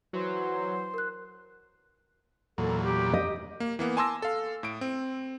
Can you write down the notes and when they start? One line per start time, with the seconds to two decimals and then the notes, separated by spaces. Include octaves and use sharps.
0.13 E3 F#3 C5
0.94 A#4 F#6
2.58 E2 A#2 F#3 A4
2.82 G4
3.14 D#5
3.60 A#3
3.79 E3 A#3 B3
3.97 G#5 A5 C6 D6 E6 A#6
4.22 A4 F5
4.63 A2 D7
4.81 C4